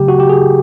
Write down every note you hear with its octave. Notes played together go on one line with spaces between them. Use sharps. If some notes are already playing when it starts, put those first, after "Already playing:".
Already playing: C#3 F#3 A3 G4
F#4
G4
G#4